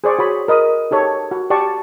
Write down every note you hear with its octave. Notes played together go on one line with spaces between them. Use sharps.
G#4 C5 D5 C#6
F#4 C#5 B5
A#4 D#5 B5 D#6
D#4 G4 A4 C#5
F#4
G4 D5 F#5 A5 C#6